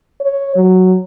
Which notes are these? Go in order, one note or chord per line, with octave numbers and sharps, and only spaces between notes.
C#5
F#3